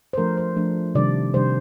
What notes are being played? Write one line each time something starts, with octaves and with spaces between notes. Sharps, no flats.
C5
F3 A3 D4 A#4
C5
F3 A3 D4
C3 D#3 G3 D4 D5
C3 D#3 G3 D4 C5